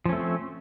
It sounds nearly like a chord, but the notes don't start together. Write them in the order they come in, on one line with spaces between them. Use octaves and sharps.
F3 C#4 A3 C4